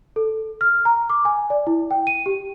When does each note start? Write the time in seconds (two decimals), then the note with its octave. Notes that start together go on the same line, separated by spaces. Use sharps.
0.16 A4
0.61 F6
0.85 A#5
1.10 D6
1.25 G#5
1.50 D5
1.67 E4
1.91 G5
2.07 D#7
2.26 G4